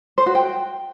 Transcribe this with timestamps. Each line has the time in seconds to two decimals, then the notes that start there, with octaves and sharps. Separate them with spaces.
0.18 C5
0.26 F#4
0.35 G5